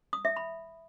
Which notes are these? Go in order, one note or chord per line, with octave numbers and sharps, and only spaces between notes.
D#6
E5
B5